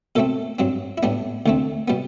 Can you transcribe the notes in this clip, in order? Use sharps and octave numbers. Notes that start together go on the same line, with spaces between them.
B2 A3 C4 A4
G2 F#3 C4
E4
A2 G3 B3 D4
D2 D3 A3 C4
B2 G3 B3